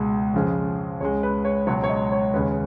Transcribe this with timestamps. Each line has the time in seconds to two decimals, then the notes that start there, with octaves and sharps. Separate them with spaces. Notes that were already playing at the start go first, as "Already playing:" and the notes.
Already playing: C#2 B2 G#3 G#4
0.34 F2 C#3 F3 G#3
1.00 C#2 C#3 G#3 C#5
1.23 B4
1.45 C#5
1.67 C#2 B2 F#3 C#5
1.84 C#5
1.89 D#5
2.12 C#5
2.33 D#2 C#3 G#3 B4